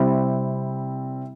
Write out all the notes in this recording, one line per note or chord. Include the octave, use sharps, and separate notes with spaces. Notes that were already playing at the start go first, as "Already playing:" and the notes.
Already playing: C3 G3 C4 E4